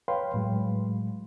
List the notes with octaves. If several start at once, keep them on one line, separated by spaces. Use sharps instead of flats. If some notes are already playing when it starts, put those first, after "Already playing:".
B4 C#5 F5 G5 B5 C6
A2 F#3 G#3